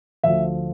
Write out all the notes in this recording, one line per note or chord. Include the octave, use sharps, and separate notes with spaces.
D2 D3 F3 E5